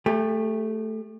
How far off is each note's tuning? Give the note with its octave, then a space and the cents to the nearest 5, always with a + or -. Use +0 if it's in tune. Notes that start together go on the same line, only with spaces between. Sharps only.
A3 +0 G4 +40